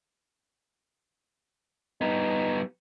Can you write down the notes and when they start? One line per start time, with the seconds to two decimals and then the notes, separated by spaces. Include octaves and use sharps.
2.01 G3 B3 D#4